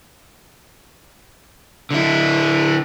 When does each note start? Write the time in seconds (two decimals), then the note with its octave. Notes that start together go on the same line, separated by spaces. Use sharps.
1.91 D3 E4